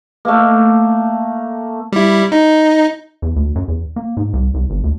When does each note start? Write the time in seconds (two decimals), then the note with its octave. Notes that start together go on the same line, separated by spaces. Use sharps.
0.25 A3 A#3
1.92 G3 E4
2.32 D#4
3.22 E2
3.36 D2
3.55 F#2
3.68 E2
3.96 A#3
4.17 G#2
4.33 C2
4.54 C2
4.70 G1
4.84 D2